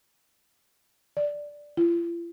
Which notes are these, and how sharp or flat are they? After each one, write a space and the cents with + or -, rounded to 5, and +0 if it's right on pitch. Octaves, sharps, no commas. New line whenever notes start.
D5 +0
F4 -45